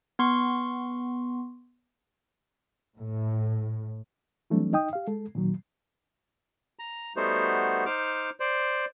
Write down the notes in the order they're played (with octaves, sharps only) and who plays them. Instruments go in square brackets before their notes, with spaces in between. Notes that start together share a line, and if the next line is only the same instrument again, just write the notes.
[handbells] B3 C6 C#6
[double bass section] A2
[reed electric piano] E3 F#3 G3 A3 C4 D4
D#4 D#5 G5 D#6
G4 F5
G#3 A4
A#2 D#3 F#3
[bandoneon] A#5
G3 A3 B3 D#4 F#4 C5
D#4 C5 D6 F6
C5 D5